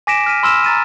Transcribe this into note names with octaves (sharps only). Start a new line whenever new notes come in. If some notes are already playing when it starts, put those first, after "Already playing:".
G#5 D6 A#6 B6 D7 E7
F6 B6 D#7
B5 C6 E6 F6 B6 E7
A#5 A6 D#7